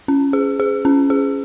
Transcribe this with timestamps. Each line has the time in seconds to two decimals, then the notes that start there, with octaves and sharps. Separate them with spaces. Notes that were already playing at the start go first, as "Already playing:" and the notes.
0.08 C#4
0.33 G#4
0.60 G#4
0.85 C#4
1.10 G#4